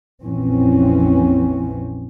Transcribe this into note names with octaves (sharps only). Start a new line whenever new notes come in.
A#1 F2 E3 C4 C#4